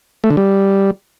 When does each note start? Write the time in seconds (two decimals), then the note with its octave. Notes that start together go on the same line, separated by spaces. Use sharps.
0.24 A3
0.30 D3
0.37 G3